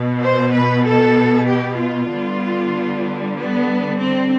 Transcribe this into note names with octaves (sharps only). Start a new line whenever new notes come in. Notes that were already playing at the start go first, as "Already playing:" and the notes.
Already playing: B2 B3
C5
B4
A4
G4
F4
D3 G3 B3
B3
C4